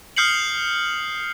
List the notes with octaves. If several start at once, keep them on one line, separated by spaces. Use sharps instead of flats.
D#6 F6 G6 C7 C#7 F#7